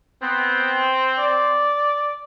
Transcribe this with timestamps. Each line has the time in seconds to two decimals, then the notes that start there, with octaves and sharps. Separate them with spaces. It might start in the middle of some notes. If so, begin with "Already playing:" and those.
0.22 B3 C4
1.18 D5